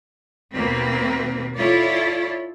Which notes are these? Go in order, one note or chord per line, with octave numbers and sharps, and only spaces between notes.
D#2 B2 A#3 C4 B4
E4 F4 A4 C#5 D5